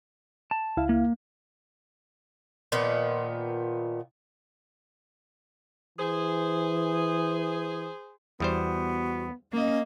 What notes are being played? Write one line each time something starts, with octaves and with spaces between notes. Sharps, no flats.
A5
C#2 E4 F5
A#3
A#2 D#3 F3 B3
E3 G#4 C5
E2 G3 B3 F#4 C5
A#3 C#4 D#5